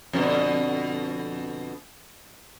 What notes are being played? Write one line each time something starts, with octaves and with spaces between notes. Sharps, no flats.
F2 B2 D3